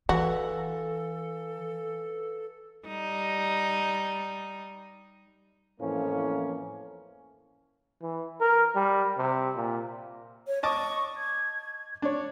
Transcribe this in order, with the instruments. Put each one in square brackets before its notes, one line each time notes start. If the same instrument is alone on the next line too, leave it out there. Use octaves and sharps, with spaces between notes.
[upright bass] E3 [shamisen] F#4 [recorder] A4 [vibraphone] B4 F5 G#5
[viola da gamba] G3 D#4
[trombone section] F2 A2 E3 F3 A#3 C#4
[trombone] E3
A#4
G3
C3
A#2
[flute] C#5
[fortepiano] D#5 A5 D6 [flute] C#6
[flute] G#6
[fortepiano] D4 C#5